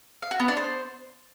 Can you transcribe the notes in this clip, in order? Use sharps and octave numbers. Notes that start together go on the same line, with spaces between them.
F5
F#4
B3
D4
C5